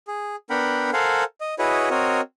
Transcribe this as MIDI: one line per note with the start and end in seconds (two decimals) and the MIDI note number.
0.07 0.36 68
0.50 0.90 59
0.50 0.90 62
0.50 0.90 70
0.50 0.90 78
0.50 0.90 79
0.50 0.90 83
0.93 1.24 69
0.93 1.24 70
0.93 1.24 72
0.93 1.24 77
0.93 1.24 78
0.93 1.24 80
1.41 1.55 75
1.59 1.89 64
1.59 1.89 66
1.59 1.89 68
1.59 1.89 71
1.59 1.89 73
1.59 1.89 75
1.91 2.21 60
1.91 2.21 66
1.91 2.21 70
1.91 2.21 73
1.91 2.21 75